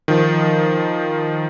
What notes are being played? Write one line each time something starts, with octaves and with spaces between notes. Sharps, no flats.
D#3 F3